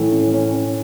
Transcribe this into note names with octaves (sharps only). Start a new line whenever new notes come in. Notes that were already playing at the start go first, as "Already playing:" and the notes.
Already playing: A2 E3 A3
C#4
C#4
C#4